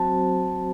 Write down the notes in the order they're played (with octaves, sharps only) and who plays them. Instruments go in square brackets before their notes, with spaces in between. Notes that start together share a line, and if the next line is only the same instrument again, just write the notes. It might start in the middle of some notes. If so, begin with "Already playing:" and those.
Already playing: [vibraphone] F#3 C4 F#4 C5 [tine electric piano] A5